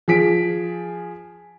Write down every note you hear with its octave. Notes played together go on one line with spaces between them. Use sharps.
F3 G#4 B6 D7